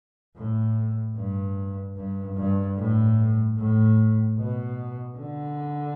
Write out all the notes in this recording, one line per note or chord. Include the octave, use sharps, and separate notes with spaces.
A2
G2
G2
G2
A2
A2
B2
D3